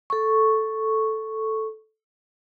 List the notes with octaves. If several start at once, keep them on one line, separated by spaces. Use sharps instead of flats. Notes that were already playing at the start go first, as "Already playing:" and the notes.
A4 C#6